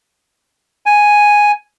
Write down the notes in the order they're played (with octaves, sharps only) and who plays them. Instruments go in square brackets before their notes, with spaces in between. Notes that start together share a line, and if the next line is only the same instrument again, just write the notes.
[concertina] G#5